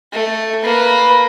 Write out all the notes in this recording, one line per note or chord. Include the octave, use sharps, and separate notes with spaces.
A3
A#3 B4